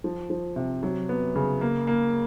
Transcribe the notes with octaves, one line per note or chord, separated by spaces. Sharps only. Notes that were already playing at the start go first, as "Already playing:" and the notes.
F3
F3
C3
F#3
B3
C#3
A#3
A#3